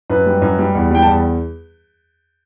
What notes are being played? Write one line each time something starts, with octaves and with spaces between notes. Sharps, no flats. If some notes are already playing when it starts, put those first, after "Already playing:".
F#2 B4
G3
F#2
G3
E2
G3 G5
A5
E2